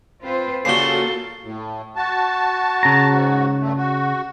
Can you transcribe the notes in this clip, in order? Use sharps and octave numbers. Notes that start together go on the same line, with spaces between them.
C4 F4 B4 C5
C#3 G3 A#3 F4 F#4 A4 C7 G7
A2
F#4 A5
C#3 A#5
G#2 F#4
G2 A3
F#4